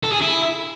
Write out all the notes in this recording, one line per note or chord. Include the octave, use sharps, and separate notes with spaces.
A4
G#4
E4